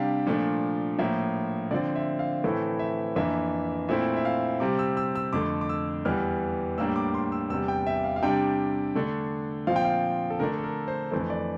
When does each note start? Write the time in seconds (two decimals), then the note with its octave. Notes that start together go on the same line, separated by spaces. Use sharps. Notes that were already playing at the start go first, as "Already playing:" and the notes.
Already playing: C3 G3 D4 F5 G5
0.27 A#2 F3 A3 D4
0.98 A2 F3 A#3 E5
1.71 D3 F3 C4 D5
1.95 E5
2.19 F5
2.44 A2 E3 A3 C4 E4 A4
2.79 E5
3.16 F2 E3 A#3 D4 E5
3.89 A#2 A3 C4 E4 E5
4.16 E5
4.25 F5
4.60 C3 G3 C4 D6
4.79 E6
4.97 E6
5.16 E6
5.33 F2 D3 A3 D6
5.61 D6
5.69 E6
6.05 E2 E3 G3 F6
6.78 A2 G3 A#3 D4 E6
6.96 D6
7.14 C6
7.32 E6
7.50 E2 C3 G3 E6
7.68 G5
7.86 E5
8.04 F5
8.16 F5
8.22 C3 G3 D4 G5
8.95 D3 A3 D4
9.67 A#2 F3 C4 F5
9.76 G5
9.85 F5
10.30 A4
10.39 D3 A3 D4 A#4
10.58 A4
10.64 A#4
10.88 C5
11.11 F2 E3 A3 C5
11.30 D5